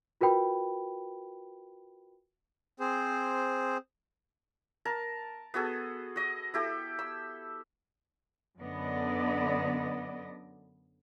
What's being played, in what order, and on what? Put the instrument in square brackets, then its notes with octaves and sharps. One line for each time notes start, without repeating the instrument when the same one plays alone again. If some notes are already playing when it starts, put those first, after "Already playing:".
[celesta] F4 F#4 A#4 B4 G5 B5
[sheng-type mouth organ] C4 G#4 C5
[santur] A#4 A5
B3 F#4 G#4 A4
F#4 D#5
E4 G4 A4
E6
[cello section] F#2 D3 B3 D5 D#5